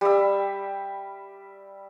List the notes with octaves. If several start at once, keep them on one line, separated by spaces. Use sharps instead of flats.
G3 E5